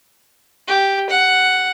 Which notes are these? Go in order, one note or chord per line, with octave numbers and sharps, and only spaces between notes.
G4
F#5